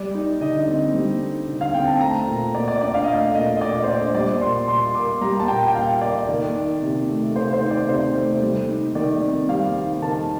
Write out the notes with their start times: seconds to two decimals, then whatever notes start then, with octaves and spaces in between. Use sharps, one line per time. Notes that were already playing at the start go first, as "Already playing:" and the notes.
Already playing: G3 D5
0.15 D#4
0.41 D3 D#5
0.68 C4
0.94 G3
1.21 D#4
1.48 D3
1.61 F5
1.74 C4 G5
1.87 A5
2.01 A3 A#5
2.27 A#2
2.54 A#2 D5
2.68 D5
2.81 D4 D5
2.94 F5
3.04 D#5
3.08 A3 F5
3.35 A#2 D#5
3.57 D#5
3.61 A#2 D5
3.84 C5
3.88 D4 D5
4.14 G3 D5
4.41 A#2 C6
4.68 A#2 C6
4.95 A#3 D6
5.21 G3 A#5
5.40 A5
5.48 A#2 G5
5.68 G5
5.75 A#2 F5
6.01 A#3 D5
6.28 D#3
6.55 D#4
6.82 C3
7.08 A3
7.35 D#3 C5
7.53 C5
7.61 D#4
7.71 D5
7.89 C3 C5
8.15 A3
8.42 G3
8.69 D#4
8.95 D#3 D5
9.22 C4
9.49 G3 F5
9.76 D#4
10.02 D#3 A5